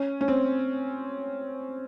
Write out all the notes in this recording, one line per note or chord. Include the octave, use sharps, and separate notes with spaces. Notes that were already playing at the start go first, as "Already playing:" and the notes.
Already playing: C#4
C#4
C4